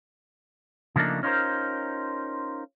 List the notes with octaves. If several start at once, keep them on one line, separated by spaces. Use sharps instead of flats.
C#3 F3 A3 A#3 D4 D#4
C#4 D#4 F4 A4 A#4 C5